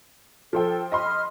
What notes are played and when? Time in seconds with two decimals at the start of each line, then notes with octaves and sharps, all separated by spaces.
0.53 F3 A4 C5 G5
0.92 D#5 B5 C6 F6